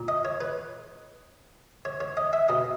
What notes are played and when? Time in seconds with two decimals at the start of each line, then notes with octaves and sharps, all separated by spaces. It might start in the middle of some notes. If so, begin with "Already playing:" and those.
Already playing: A#2
0.08 D#5
0.25 C#5
0.41 B4
1.85 C#5
2.00 C#5
2.17 D#5
2.33 E5
2.49 B2 D#5